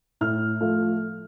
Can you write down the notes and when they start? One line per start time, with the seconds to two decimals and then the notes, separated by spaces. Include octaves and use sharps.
0.21 A2 F6
0.61 F3 A3